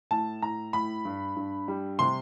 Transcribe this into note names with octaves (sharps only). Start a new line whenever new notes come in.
A2 A5
A2 A#5
A2 B5
G2
G2
G3
C3 C6